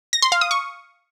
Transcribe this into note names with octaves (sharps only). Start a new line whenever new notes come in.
A#6
C6
F5
D#6
C#6